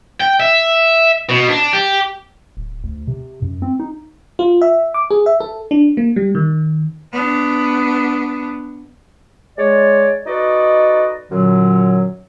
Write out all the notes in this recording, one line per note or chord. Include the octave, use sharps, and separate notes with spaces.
G5
E5
B2
D4
G4
D1
D2
C3
F#2
C4
D#4
F4
E5
D6
G#4
E5
A4
D4
A#3
G3
D#3
B3 D4
G#3 C#5 D5
D#4 F#4 A4 B4 D5 D#5
F#2 A#2 D3 F#3